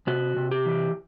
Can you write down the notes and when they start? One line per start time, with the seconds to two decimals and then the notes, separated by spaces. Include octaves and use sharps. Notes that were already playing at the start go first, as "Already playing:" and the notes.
0.07 C3 F#4
0.37 C3
0.51 G4
0.66 E3